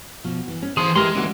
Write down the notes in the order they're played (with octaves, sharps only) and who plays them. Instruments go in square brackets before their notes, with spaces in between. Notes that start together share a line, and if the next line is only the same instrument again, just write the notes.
[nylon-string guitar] B2 F3
E3
C#4
[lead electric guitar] E3 C6 [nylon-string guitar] C4 [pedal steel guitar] G#4
[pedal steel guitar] E3 A#4 C6 [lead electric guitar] G#3 [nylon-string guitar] G4
[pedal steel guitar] D3 E3 A#3 [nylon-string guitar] C#4 F#4